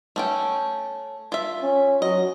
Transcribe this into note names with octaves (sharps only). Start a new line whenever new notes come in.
A3 C#4 G5
F4 E5
C#4
F#3 D#5